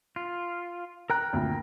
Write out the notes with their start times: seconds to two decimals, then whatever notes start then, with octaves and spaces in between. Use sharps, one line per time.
0.16 F4
1.10 A#4 G5 A#5 F#6
1.33 D2 A#2